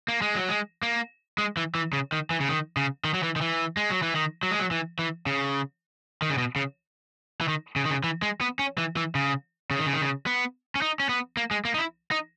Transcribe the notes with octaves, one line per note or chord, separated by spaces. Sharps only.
A#3
G#3
F#3
G#3
A#3
G#3
E3
E3
C#3
D#3
E3
C#3
D#3
C#3
D#3
F#3
E3
D#3
E3
G#3
F#3
E3
D#3
F#3
G#3
F#3
E3
E3
C#3
D#3
C#3
B2
C#3
E3
D#3
C#3
D#3
C#3
E3
G#3
B3
C#4
E3
E3
C#3
C#3
D#3
C#3
D#3
C#3
B3
C#4
D#4
C#4
B3
A#3
G#3
A#3
D#4
E4
D#4